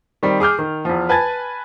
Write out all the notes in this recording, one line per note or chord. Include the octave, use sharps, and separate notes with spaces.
D#3 G3 C4
G#4 D6 F6 G6
D#3
E2 F3
B4 G#5 A5 F#6 G#6 A6